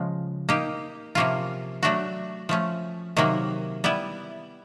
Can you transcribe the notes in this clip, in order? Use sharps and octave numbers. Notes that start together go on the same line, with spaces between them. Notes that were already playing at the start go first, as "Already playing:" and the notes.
Already playing: C#3 F3 G#3
A#3 D#4 G4
C3 F3 A#3 C#4 F4
F#3 A3 D4 F#4
F3 A3 C#4
C3 D#3 F#3 A#3
G3 B3 E4